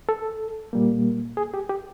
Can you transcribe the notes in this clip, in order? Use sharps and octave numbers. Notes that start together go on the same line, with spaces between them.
A4
A#2 G3 A#3
G#4
G4
G4